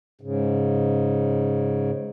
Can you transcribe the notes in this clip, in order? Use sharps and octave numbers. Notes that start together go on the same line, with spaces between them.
G#2 C#3